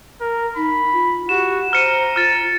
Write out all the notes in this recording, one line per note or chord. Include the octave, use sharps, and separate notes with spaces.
A#4
D#4 B5
F4
F#4 G4 E7
C5 A#5 F6 C#7 D#7
F4 F6 A6